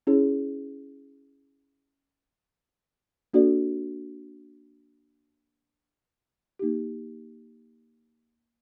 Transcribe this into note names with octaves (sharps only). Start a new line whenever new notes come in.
C#4 E4 G#4 C#5
A#3 D4 F#4 A4 D5
A#3 D#4 G4